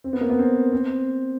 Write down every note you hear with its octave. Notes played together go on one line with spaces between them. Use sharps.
C4
B3
A#3
B3
C4
C4